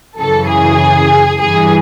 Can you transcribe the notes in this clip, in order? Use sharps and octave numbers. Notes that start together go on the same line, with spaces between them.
F#2 C#3 E3 A4
G#4
G2 E3 G#4